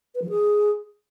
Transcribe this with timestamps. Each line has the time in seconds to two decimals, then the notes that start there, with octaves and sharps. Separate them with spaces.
0.15 B4
0.22 F3
0.29 G#4